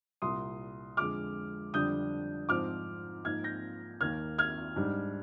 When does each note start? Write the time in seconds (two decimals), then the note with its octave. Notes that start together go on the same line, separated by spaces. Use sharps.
0.22 C2 A#2 G3 C6 D#6
0.97 F2 D3 G#3 D6 F6
1.74 F2 D3 G3 D4 D#6 G6
2.49 G#2 F3 C4 D6 F6
3.25 G#2 F3 A#3 D#4 F6 G#6
3.44 G6 A#6
4.01 D#2 D#3 A#3 F6 G#6
4.38 F6 G#6
4.76 G#2 G3 D4